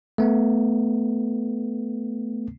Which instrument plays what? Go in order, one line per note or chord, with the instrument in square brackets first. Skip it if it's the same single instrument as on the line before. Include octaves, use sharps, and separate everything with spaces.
[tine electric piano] A3 B3